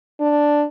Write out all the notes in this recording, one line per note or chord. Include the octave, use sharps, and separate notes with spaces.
D4